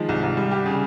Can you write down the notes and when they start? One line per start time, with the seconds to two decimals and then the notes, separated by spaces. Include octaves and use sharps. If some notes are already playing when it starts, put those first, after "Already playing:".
Already playing: D#3 F3 G#3
0.09 C2
0.23 C2
0.37 G3
0.51 G4
0.66 C#3